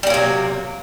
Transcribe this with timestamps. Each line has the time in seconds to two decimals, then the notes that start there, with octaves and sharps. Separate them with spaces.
0.03 G3
0.07 A#3
0.10 F#3
0.14 C3